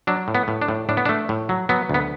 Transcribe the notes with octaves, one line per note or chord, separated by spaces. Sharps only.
F#3 D4
A2
B3
A2
D4
A2
A2 D4
B3
A3 D4
A2
F#3
F#3 B3
D2 B3